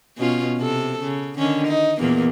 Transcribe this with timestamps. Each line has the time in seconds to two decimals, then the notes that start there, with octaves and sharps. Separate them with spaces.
0.17 B2 C#4 F4
0.57 C3 A4
1.03 C#3
1.38 D3 D#3 C#4
1.67 D#4
1.99 E2 A#2 A#3